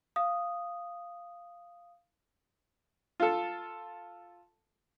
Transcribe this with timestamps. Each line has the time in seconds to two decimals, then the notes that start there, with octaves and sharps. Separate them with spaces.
0.16 F5 D#6
3.20 F4 A4